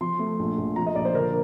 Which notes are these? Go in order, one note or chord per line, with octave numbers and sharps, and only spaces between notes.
F3 C6
A3
A#1
A#1
F3 A#5
D#5
A#1 D5
C5
D3 A#4